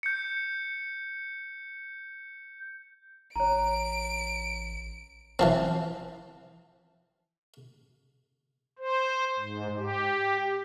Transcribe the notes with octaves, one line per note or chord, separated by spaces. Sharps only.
G6 C#7
A1 C#5 A#5 D7
E3 F3 C4
C5
G#2
G4